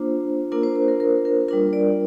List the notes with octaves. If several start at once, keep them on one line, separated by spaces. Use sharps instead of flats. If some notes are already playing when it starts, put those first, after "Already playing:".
Already playing: A#3 D4 F4 C5
A#3 D4 F4 A#4
C5
C5
A#4
A#4
A#4
G3 D4 F4 A#4
D5